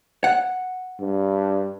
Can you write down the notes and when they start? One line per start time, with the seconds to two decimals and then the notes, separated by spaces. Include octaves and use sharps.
0.24 F#5
1.00 G2